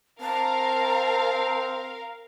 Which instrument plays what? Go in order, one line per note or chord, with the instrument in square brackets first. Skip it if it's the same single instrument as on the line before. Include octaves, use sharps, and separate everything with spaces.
[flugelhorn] C4 [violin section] A#4 F5 [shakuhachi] A5